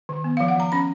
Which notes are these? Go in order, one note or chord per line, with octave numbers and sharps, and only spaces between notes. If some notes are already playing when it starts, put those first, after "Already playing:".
D#3
B3
F3 F5
F#5
F3 A#5
C#4 B5